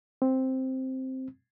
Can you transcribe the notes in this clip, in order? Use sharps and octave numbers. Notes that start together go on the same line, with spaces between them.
C4